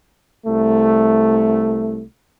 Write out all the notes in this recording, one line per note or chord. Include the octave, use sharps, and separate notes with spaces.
C2 A3